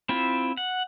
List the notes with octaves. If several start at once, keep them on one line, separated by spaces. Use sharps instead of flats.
C4 E4 F4
F#5